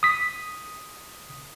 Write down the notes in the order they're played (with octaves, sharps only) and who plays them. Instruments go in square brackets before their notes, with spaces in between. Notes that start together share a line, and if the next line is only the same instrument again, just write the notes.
[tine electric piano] D#6 B6